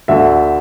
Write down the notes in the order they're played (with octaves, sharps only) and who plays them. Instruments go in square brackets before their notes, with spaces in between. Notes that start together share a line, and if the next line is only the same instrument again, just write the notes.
[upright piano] D2 D3 E5